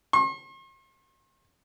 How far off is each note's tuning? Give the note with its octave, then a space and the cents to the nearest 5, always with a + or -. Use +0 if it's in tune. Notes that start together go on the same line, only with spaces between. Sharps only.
C6 +45